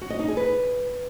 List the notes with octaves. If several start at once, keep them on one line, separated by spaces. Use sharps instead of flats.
F#4
D#5
D#4
G#4
B4